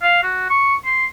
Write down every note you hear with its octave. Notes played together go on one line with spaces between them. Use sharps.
F5
F#4
C#6
C6